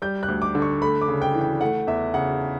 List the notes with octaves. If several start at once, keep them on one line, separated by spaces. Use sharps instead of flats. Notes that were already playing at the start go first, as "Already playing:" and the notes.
G3 G6
F#6
D2
D6
D3
C#6
A3 B5
D6
C#3
G5
E3
G5
A3 F#5
E2 E5
C#3 F#5